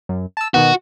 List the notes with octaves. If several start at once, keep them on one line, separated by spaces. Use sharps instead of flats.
F#2
A5 E6
B2 D#3 B3 F#4